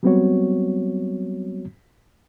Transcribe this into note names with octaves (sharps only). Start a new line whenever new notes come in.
F#3 G3 B3 C4 F#4 C#5